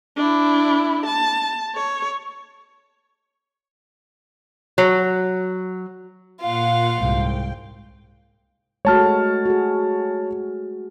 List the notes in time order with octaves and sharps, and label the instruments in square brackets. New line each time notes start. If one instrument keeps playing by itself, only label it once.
[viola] D4 E4
A5
C#5
[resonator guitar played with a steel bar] F#3
[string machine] A#2 F#5 [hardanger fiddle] F4 F5
[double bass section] C2 G#2 [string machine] G5
[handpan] G#3 A3 F#4 [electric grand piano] C#5 A5 F6
[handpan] F#4 G#4